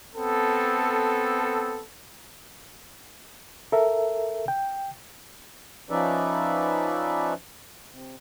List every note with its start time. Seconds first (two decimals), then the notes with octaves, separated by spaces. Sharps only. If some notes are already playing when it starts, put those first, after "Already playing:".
0.15 B3 C4 A4
3.72 A4 A#4 E5
4.48 G5
5.90 F3 C#4 D#4 B4 D5 E5
7.91 C3